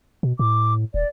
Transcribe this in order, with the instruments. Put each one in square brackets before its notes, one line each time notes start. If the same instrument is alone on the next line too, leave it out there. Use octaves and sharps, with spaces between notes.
[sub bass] B2
[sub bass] A2 [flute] D6
[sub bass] D#1 [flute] D5